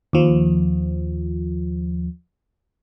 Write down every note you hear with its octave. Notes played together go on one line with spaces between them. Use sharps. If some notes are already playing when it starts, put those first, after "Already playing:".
D#2 F3